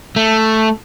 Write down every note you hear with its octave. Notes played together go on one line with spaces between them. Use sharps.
A3